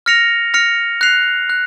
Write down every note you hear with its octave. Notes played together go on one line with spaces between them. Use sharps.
F6 A#6 C#7 F7
F6 A#6 C#7 F7
F#6 C7 F7
F#6